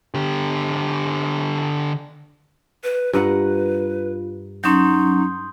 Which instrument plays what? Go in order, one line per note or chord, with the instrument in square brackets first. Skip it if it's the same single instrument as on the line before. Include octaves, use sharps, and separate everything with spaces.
[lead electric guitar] D3 G4
[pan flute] B4
[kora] G2 A#4 F#5 [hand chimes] F4 [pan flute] B4
[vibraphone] F#3 C#4 [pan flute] D#4 [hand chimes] C6 D#6 G6